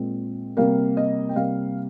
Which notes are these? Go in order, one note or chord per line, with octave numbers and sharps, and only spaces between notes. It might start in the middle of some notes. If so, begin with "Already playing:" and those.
Already playing: A#2 G#3 C4
C3 G3 A#3 F5
D#5
G5
C3 G3 A#3 F5